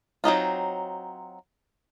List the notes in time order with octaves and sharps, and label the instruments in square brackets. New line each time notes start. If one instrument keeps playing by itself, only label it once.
[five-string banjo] F#3 C4 D#4 F4